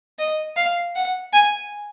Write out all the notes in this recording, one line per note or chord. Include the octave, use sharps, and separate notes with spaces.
D#5
F5
F#5
G#5